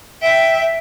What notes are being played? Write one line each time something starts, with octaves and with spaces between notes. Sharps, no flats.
E5 G5